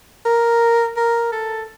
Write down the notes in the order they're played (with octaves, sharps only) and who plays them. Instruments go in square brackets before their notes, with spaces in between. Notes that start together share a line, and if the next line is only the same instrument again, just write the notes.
[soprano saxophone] A#4
A#4
A4